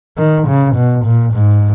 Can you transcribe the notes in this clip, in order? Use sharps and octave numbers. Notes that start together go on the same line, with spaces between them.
D#3
C#3
B2
A#2
G#2